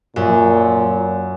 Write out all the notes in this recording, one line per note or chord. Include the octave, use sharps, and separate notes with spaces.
F#2 A#2